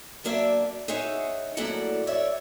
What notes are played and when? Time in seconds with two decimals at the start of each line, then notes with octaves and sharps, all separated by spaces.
0.24 F#3 A#3 D4 D5 E5
0.88 D#4 G#4 C#5 E5 F#5
1.57 F#2 A2 A#3 A4 D5 F#5
2.07 C#5 D5 E5